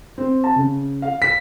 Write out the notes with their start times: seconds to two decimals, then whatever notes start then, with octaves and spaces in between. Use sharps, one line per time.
0.18 C4
0.44 A5
0.56 C#3
1.02 F5
1.22 B6